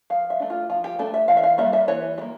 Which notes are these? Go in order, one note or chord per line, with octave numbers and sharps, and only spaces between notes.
F3 F5
E5
A3 D4
F4
F3 F4
G4
A3 D4 A4
E5
E3 F5
E5
F5
G3 A#3 E5
E5
E3 C#5
G3
A#3